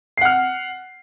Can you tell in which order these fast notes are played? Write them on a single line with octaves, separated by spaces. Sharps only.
C7 F#5 F6